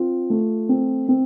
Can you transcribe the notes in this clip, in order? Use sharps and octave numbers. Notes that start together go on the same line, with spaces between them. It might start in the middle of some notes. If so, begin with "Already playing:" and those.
Already playing: C4 F4
A3
C4
C4